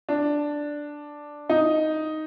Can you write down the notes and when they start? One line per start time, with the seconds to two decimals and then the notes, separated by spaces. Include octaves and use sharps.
0.09 D4
1.49 D#4